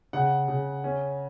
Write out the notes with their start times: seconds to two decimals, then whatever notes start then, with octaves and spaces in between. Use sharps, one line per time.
0.13 C#3 F#5
0.48 C#3
0.84 C#4